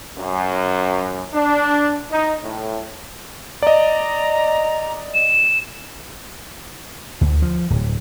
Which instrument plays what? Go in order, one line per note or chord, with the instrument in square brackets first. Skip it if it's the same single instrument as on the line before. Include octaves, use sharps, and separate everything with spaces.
[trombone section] F#2
D4
D#4
A2
[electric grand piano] D5 D#5 [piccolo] A#5
[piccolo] E7
[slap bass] D2
F3
D1